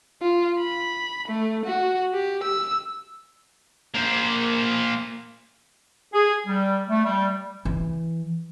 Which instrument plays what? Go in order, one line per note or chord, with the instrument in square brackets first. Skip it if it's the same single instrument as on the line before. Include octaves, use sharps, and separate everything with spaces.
[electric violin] F4
B5
A3
F#4
G4
E6
[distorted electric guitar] A#3 C5
[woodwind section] G#4
G3
A3
G3
[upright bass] E3